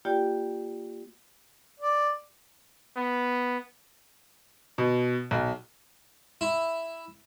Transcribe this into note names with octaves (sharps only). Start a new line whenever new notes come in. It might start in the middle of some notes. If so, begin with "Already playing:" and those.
A#3 F4 G4 D5 G5
D5
B3
B2
B1
E4